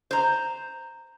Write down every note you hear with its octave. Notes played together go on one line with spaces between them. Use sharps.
C5 A#5